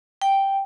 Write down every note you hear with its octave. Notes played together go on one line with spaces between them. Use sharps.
G5